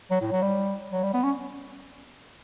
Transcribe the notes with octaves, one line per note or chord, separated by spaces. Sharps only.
F#3
A2
F#3
G3
F#3
G3
B3
C#4